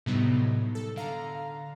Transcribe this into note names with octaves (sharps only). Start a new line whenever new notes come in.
A2 C3 F#3 G3 B3 D#4
A4
D3 F5 A#5